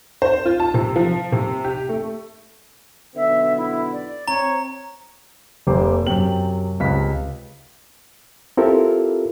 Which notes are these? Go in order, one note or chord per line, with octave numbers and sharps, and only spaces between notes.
C5
F4
A5
C3
F3
C3
G4
A3
B1 D3 B3 E5
E4
D5
C4 C#5 A#5
F1 A#3 G4 C5 D6
F#2 C3 G5 F#7
C#2 C3 B6
C4 E4 F4 G4 A4 A#4